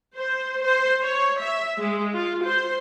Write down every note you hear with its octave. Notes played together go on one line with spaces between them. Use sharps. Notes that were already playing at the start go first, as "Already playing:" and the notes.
C5
C5
C#5
E5
G#3
F4
C5